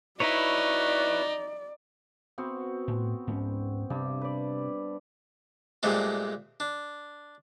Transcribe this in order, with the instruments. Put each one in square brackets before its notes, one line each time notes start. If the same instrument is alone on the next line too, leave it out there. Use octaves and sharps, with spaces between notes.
[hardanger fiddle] D#4 [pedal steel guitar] E4 B4 C#5 [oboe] F#4 [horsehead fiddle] D5
[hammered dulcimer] B3 C4 F#4
[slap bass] A2
G#2 C#4
[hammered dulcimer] G2 [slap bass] C3
[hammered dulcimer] B4 D5
[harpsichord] G2 A#2 G#3 A3 C4
D4